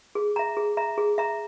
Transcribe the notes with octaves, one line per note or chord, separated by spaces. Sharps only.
G#4
E5 A#5
G#4
E5 A#5
G#4
E5 A#5